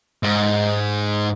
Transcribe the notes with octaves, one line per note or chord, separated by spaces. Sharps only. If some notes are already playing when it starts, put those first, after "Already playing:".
G#2